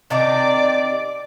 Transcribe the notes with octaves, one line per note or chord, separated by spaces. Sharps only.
C3 D#3 D4 D5 D6